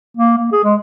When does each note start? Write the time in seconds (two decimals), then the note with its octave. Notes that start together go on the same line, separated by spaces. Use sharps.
0.17 A#3
0.38 A#3
0.52 G#4
0.64 G#3